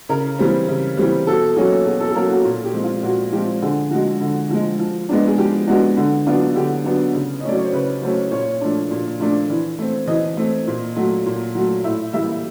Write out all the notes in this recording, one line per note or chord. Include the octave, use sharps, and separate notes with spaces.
C#3 A#4
E3 G3 C4
C#3
E3 G3 C4
B2 A4
F#3 A#3 C#4 G#4
B2 G#4
A4
A4
F#3 A#3 C#4 A#4
F#4
A#2
G4
F3 G#3 C4
F4
A#2 F#4
F3 G#3 C4 G4
D3 G#4
F3 G#3 F#4
D3
F3 G#3
F3
G#3 B3 D4
G#4
F3 G4
G#3 B3 D4 F#4
D3
F#3 B3 D4 F4
D3 G4
F#3 B3 D4
C#3
D#5
F#3 A3 C#4 D5
C#5
C5
C#3 B4
F#3 A3 C#4 C5
A#2 C#5
F3 A3 D4
A#2
F3 A3 D4
E3
A3 C4
E3 D#5
A3 C4
A#2
F#3 A3
A#2
F#3 A3
A2 E5
E3 G3 A#3 E5